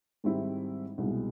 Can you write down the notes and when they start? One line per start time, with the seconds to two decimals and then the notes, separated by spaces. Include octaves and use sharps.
0.24 G#2 D#3 G3 C4 E4
0.98 C2 B2 G#3